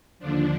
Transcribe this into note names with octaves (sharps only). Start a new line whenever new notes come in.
D#2 D3 F3 D4